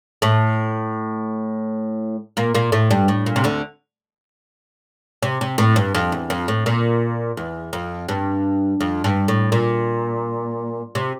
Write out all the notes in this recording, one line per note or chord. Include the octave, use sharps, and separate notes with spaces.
A2 A3
A#2 A#3
A#2 A#3
A2 A3
G2 G3
A2
A#2
C3
D2 D3
C3
C3
A2
G2
F2
E2
F2
A2
A#2
E2
F2
G2
F2
G2
A2
A#2
C3